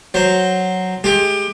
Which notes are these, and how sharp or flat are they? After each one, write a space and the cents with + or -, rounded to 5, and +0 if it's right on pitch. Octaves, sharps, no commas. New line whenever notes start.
F#3 +0 C5 +0
G#3 +30 G4 +25